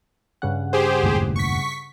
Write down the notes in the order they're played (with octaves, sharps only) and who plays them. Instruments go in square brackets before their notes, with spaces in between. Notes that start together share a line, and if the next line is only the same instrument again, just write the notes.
[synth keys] G2 C#3 F#5
[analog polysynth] G4 G#4 C5
[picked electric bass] F#1 D#2 A2
[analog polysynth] C#6 B6